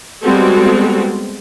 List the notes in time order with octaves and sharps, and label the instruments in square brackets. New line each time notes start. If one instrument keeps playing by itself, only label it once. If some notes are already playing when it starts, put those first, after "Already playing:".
[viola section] G3 G#3 B3 C4 F#4 A4